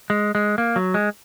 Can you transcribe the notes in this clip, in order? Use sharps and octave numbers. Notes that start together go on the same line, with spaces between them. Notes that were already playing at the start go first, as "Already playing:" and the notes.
G#3
G#3
A#3
F#3
G#3